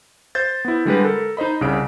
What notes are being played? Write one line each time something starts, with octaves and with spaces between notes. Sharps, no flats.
C5 G6 A6
B3 E4
D3 G3 G#3 B4
A4 A#4
D#4 C5 D#5 B5
C2 C#3 D7